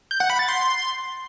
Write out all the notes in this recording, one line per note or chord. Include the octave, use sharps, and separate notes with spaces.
G6
F#5
B5
A6
C6